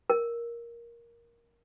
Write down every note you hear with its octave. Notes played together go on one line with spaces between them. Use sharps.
A#4